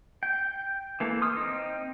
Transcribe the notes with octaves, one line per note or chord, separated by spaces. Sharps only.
G5
E3 A#3 A4
C6 D#6 F6
C4 D#4